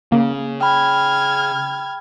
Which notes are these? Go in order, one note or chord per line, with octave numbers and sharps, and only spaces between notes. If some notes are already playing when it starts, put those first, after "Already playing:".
C#3 A#3
G5 B5 F6 G#6